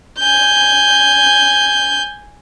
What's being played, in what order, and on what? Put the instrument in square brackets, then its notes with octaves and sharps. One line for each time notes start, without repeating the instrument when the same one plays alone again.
[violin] G#5 G6